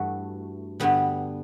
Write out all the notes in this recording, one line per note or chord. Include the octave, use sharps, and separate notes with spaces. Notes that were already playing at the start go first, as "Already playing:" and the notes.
Already playing: G2 E3 A3 F#4
G2 D3 G3 B3